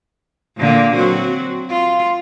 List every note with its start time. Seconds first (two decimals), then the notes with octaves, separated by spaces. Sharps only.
0.57 A#2 D3 A#3
0.95 F#3 C4 F#4
1.69 F4